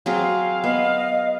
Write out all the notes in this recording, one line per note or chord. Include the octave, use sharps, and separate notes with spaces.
F#3 C4 G#4 F5
B3 D#5